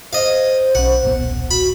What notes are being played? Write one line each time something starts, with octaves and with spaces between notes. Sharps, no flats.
C5 D#5 F5
B1 C#4 F#5
D#1 B1 B3
F#4 B5